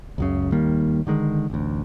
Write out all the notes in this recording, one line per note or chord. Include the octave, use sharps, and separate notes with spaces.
C#2 F#2 C#3
D#2 D#3 G3 A#3
D3 D#3 G#3
A1 D2